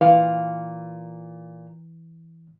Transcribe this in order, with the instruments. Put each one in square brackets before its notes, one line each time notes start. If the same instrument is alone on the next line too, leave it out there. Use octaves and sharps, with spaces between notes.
[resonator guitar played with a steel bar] A#2 F5 [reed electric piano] E3